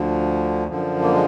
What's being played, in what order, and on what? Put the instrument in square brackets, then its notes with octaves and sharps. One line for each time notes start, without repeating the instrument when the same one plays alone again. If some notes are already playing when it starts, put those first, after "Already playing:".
Already playing: [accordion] D2 D3 F3
F#2 D3 F3
A#3
G#3